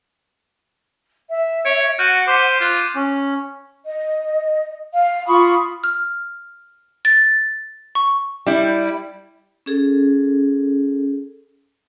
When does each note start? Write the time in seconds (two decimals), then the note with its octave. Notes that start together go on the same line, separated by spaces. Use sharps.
1.29 E5
1.66 C#5 D7
1.99 F#4 F#5 F6 G6 D#7
2.28 C5 D6 B6
2.61 F4 F#6
2.95 C#4
3.85 D#5
4.92 F5
5.27 F4 B5 C#6 D#6
5.84 F6
7.05 A6
7.95 C#6
8.46 G3 E4
9.66 C#4 G#4 A4